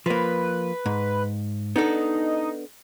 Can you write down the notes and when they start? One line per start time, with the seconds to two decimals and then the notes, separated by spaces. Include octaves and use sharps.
0.06 F3 A#3 B4
0.86 G#2
1.76 B3 D4 D#4 A4